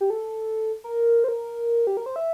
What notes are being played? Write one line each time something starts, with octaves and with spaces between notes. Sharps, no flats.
G4
A4
A#4
C5
A#4
G4
A#4
C5
E5